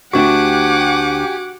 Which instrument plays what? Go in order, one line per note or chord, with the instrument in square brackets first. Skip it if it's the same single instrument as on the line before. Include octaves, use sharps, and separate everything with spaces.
[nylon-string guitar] D2 D4 E5 [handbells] F#4 [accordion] G4 G#5 [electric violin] F#5 D6